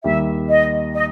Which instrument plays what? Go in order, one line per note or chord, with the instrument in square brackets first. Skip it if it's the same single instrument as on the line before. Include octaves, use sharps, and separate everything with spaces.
[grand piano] D#2 D#3 G3 [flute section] E5
[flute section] D#5
D#5